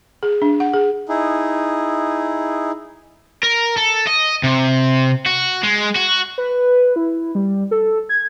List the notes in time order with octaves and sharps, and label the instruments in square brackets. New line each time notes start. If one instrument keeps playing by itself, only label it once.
[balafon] G#4
D4
F#5
G#4
[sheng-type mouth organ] D#4 E4 G#4
[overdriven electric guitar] A#4
A4
D#5
C3
F#4
G#3
F#4
[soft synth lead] B4
E4
G3
A4
G#6